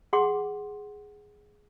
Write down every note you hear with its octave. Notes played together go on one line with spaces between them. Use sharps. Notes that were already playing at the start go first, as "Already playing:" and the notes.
G#4 F#5 C6 D6